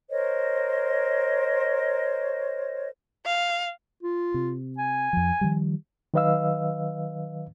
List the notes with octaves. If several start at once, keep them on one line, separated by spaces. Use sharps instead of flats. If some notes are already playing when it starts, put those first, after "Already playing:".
A#4 C5 C#5 D#5
F5
F4
C3
G#5
F2 F3
D#3 F3 G3
D#3 F#3 B4 D#5 F5 E6